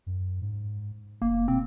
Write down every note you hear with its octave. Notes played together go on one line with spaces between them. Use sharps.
F#2
G#2
F1 A#3
B2 C4